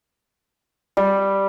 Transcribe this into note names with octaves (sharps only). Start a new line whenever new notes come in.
G3